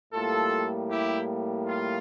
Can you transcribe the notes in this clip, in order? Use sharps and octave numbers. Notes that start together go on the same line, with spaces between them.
A2 G3 A#3 F4 A4
E4 G4
F4